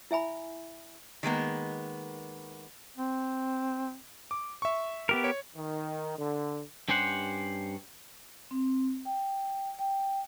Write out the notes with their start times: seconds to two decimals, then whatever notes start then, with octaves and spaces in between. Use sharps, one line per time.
0.11 E4 E5 G#5 B5
1.23 D#3 G#3 A#3 B3
2.97 C4
4.31 D6
4.62 E5 C#6
5.09 B3 G4 A#4
5.24 C#5
5.56 D#3
6.19 D3
6.88 G2 C#4 G4 C5 F#5
8.51 C4
9.05 G5
9.79 G5